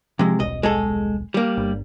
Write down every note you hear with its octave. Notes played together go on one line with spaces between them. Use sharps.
C3 F3 G#3
D#1 B1 D#5
G#3 G#4 A4
G3 A#3
G1